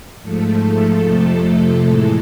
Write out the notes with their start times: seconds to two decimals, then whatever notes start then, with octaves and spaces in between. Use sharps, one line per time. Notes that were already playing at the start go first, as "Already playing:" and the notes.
0.23 G#2 F3 A3 A4
1.03 F2 C3 F3 A3
1.84 A2 E3 G#3